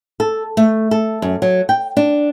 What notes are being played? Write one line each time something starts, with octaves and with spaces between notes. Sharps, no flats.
A4
A3
A4
F#2
F#3
G5
D4